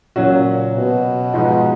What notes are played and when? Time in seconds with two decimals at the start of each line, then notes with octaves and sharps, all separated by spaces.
0.16 A#2 C#3 F#3 C#4 F#4
0.76 B2
1.34 G#2 F3 G#3 D#4 F#4